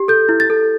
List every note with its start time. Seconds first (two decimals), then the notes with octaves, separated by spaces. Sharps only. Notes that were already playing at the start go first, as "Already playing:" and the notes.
Already playing: G4
0.08 A4 G6
0.29 E4
0.40 A6
0.50 A4